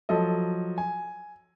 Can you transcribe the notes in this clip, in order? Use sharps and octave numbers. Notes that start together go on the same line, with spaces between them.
F3 F#3 A4 D#5
G#5